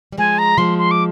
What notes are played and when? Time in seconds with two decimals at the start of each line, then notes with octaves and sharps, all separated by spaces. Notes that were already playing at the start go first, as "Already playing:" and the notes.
0.12 G3
0.18 F3 G#3 G#5
0.38 A#5
0.58 F3 G#3 C6
0.78 C6
0.91 D6